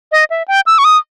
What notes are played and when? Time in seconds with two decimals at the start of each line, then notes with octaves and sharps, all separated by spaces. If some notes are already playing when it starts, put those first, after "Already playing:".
0.12 D#5
0.30 E5
0.48 G5
0.67 E6
0.78 C#6
0.85 D#6